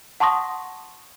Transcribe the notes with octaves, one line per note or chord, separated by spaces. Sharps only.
F#5 A5 C6 C#6 D#6 A#6